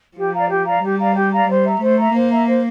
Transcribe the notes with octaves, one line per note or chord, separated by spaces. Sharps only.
F3 G4
D5 F5 A#5
G4
D5 F5 A#5
G3 G4
D5 F5 A#5
G4
D5 F5 A#5
G3 C5
E5 A#5
A3 C5
E5 A#5
A#3 C5
E5 A#5
C5